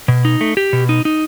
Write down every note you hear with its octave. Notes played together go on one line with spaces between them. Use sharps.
B2
D#4
A3
G4
B2
D#4
D#4